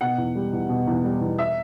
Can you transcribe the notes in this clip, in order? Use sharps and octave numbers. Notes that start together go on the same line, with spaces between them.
B2 F#5
E2
G3
E2
B2
E2
G3
E2
E5